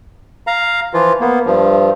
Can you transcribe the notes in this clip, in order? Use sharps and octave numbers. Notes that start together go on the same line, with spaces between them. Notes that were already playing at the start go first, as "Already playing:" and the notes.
F5 A#5
E3 F3 F4
A#3 B3
G2 F3